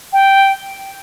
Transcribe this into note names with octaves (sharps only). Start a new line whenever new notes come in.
G5